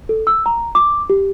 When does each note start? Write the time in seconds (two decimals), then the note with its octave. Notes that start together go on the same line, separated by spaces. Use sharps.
0.09 A4
0.27 E6
0.46 A#5
0.75 D6
1.10 G4